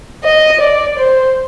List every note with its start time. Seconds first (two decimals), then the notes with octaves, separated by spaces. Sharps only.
0.24 D#5
0.61 D5
0.99 C5